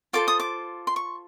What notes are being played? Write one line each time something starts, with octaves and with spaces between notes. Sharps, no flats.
F4 A4 C5 D6
D#6
D6
C6
C#6